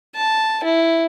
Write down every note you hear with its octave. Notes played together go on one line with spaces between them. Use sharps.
A5
E4